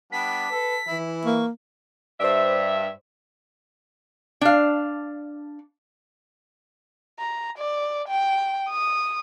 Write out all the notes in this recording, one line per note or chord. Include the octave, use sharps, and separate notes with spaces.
G3 B3 D4 B6
A4 B4
E3 E4
A#3 C#6
G2 C5 D5 E5
D4 F5
A#5
D5
G5
D#6